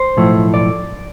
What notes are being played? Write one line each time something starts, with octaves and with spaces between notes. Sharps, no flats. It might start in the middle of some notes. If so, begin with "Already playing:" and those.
Already playing: C5
B1 A2 F3 A3
D5